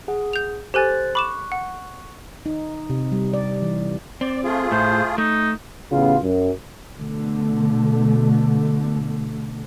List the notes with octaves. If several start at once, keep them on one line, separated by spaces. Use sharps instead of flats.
G#4 F#5
G6 F7
G4 A4 C5 G#5 F#6 A6
B5 C#6 D6 F#6 E7
F#5
D#4
C3
G3
D5
E3
C4 D5
A3 F4 G#4
A2 C5
A3 D#4
A1 C#3 B3 F4
F#2
B2 D3 A3